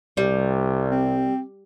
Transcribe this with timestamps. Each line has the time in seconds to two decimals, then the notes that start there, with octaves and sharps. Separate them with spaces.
0.17 C2 G3
0.91 C4